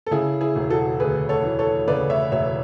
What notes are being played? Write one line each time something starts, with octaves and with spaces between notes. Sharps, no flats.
A4
C#3 E4 G#4
E4 G#4
E1
F#4 A4
D2 G#4 B4
A4 C#5
E3
A4 C#5
C#3 B4 D5
C#5 E5
E1 C#5 E5